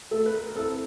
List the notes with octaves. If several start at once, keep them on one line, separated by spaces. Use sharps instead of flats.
A3 A4
B4
A#4
A#4
C4 E4 A4